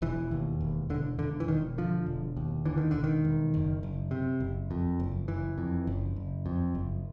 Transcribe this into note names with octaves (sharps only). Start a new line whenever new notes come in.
E1 E3
D#2
E1
E1 D3
E1 D3
E3
E1 D#3
D3 F3
E1
D#2
D3 E3
D#3
E1 D3
D#3
E1
F#1
F#1
C3
F#1
F2
F#1
F#1 E3
F2
F#1
F#1
F2
F#1